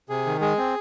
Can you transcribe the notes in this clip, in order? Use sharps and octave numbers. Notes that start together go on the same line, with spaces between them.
C3 G#4
D#3
G#3 G#4
C4